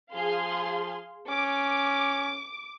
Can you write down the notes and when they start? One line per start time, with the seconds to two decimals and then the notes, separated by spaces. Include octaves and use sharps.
0.15 F3 G#4 F5 C6
1.29 C#4 D6